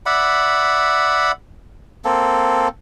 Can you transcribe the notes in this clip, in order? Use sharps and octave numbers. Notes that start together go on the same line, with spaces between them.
D5 E5 F#5 B5
A#3 C4 A4